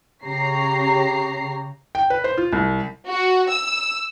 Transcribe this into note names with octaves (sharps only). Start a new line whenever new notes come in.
C#3 G4 C#5 A#5 C7
G5
B4
C5
F4
C2
F#4
E6